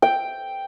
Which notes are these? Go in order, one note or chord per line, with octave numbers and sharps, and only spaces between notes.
G5